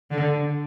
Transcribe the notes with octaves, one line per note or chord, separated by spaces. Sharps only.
D3